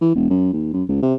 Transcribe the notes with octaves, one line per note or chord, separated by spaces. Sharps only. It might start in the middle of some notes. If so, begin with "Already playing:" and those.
E3
E1
F#2
D#2
F#2
C#2
C3